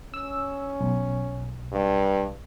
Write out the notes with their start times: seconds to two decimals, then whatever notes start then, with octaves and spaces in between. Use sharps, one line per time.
0.14 C#4 E6
0.81 B1
1.72 G2